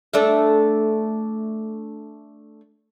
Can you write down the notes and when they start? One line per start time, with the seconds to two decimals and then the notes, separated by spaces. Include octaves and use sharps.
0.14 A3 D4 E5